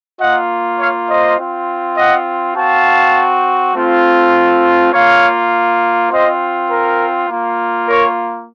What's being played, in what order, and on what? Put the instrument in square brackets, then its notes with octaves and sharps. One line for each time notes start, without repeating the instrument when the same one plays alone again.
[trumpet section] A#3 F4 D#5 F#5
C#5 F5
C5 D#5
C4 F4
D#5 F#5
C4 F#4 F5 A5
A3 C4 F4
A#3 F4 C#5 F5
C4 F4 C5 D#5
A#4
A#3 F4
A#4 C#5